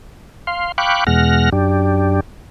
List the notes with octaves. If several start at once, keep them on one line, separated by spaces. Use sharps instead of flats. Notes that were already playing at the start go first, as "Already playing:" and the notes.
F5 C6
F5 G5 B5 C#6 D6 F#6
E2 B2 G#3 F#5 F6 A#6
F#2 D4 G4